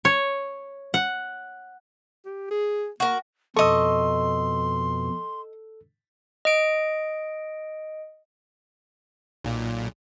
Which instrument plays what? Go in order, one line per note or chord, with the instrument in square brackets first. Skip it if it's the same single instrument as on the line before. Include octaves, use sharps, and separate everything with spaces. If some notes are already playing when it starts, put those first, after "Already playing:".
[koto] C#5
F#5
[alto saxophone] G4
G#4
[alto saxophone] A#3 [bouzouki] F#4 A#4
[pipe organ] F2 B2 [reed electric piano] A4 E6 [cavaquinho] D#5 C#6 [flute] C6
[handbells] D#5 D7
[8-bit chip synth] B1 A#2